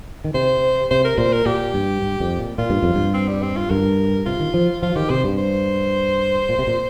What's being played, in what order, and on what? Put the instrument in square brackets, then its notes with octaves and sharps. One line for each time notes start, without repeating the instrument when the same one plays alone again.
[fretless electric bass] D#3
[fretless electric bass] C3 [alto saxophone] C5
[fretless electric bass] C3 [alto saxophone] C5
[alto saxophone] A#4
[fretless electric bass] A#2 [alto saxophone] C5
[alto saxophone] A#4
[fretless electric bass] A#2 [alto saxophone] G4
[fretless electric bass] G2
G2
F2
A#2
[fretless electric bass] A#2 [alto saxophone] F4
[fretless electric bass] G2
F2
G2
[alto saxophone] C4
G3
C4
F4
[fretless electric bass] G2 [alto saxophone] A#4
[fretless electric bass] C3 [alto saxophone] F4
[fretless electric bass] D#3
F3
[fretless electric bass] F3 [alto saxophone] F4
[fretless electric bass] D#3 [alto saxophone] G4
[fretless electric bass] C3 [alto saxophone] C5
[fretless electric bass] G2
[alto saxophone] C5
[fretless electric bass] A#2
C3
A#2